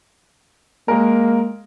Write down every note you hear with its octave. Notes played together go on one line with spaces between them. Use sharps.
G#3 A#3 A#4